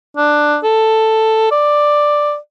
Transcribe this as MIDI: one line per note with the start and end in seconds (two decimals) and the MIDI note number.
0.17 0.57 62
0.64 1.49 69
1.52 2.36 74